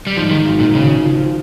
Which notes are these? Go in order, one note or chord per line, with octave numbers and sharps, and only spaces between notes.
G3
G#2 F3
D#3
G#1
A#2
G#1 C#3
F3